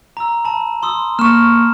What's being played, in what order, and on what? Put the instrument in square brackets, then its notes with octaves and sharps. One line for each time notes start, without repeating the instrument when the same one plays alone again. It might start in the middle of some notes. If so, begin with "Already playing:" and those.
[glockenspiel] A#5 E6
A5 B5
C6 D#6 E6
[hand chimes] A#3 C#6 [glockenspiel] F6 E7